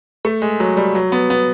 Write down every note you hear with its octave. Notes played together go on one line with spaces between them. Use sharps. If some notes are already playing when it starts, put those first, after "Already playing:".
A3
G#3
F#3
G3
F#3
B3
B3